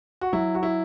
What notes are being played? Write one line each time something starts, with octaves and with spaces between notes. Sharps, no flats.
F#4
F#3 E4
F#4
E4